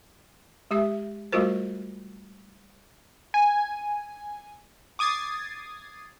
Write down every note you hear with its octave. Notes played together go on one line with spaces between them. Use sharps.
G#3 G4 E5
G3 A3 F4 F#4 A#4 C5
G#5
D6 D#6 G#6 A6 C7